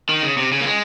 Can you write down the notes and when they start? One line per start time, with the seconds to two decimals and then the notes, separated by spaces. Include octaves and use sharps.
0.09 D#3
0.23 C#3
0.37 C3
0.52 C#3
0.61 A#3
0.66 G#3